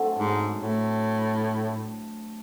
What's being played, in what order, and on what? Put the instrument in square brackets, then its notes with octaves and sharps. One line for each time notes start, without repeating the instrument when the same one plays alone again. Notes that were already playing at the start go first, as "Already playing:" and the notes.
Already playing: [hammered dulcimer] D3 F#3 A3 C4
[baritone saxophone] G#2
A2